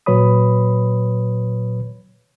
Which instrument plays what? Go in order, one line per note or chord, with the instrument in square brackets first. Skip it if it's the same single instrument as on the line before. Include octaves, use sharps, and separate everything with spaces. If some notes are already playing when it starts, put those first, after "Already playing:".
[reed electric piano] A#2 F#3 B4 C#5 B5 D#6